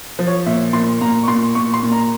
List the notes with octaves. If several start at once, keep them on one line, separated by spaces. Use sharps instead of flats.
F3
C#5
A#2 E5
A#2 C6
A#2 A#5
C#6
A#2 C6
A#2 C#6
C6
A#2
A#5